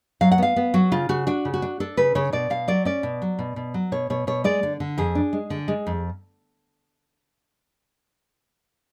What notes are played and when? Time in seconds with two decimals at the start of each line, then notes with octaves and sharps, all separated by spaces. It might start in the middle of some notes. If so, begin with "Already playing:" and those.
0.21 F#3 F5
0.32 F#5
0.38 B3 F5
0.56 B3
0.74 F#3 F#4
0.92 C#3 F4
1.09 C#3 F#4
1.27 D4 F#4
1.45 C#3
1.54 F#4
1.62 D4
1.80 D4 A4
1.97 C#3 B4
2.15 C#3 C#5
2.32 B2 D5
2.50 B2 F5
2.68 F#3 D5
2.85 C#4 D5
3.03 B2
3.22 F#3
3.39 B2
3.56 B2
3.74 F#3
3.92 B2 C#5
4.10 B2 C#5
4.27 B2 C#5
4.44 G#3 D5
4.63 D3
4.80 D3
4.98 F2 G#4
5.15 D4
5.33 G#3
5.50 D3
5.68 G#3
5.87 F2